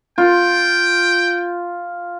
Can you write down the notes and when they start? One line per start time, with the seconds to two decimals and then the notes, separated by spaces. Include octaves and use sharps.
0.18 F4 G5